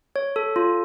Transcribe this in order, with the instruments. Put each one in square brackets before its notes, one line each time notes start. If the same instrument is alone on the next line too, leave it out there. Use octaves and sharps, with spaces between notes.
[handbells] C#5
A4
F4